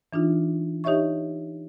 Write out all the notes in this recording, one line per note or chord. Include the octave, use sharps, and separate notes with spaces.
E3 D4 D#4 F4
D#4 G4 C#5 D#5 E5 C#6